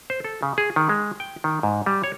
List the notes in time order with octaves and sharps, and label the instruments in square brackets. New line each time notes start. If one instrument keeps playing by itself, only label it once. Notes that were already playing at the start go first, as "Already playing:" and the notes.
[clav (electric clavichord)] C5
A4
C#3
G#4
D#3
G#3
G5
D#3
G#2
G3
C#5